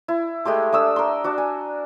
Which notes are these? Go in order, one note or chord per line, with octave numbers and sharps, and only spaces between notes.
E4
G#3 A3 G4 C6
A3 D4 D#6 E6
A#4 C6
D4 F#4
G#5